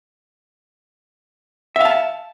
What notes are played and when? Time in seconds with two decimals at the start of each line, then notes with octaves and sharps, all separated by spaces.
1.76 E5
1.81 F5
1.85 A5